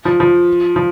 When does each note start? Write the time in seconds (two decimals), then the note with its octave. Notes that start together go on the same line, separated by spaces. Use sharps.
0.05 F3
0.20 F3
0.76 F3